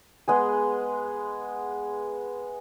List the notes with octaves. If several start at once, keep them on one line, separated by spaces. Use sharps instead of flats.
G#3 B3 G#4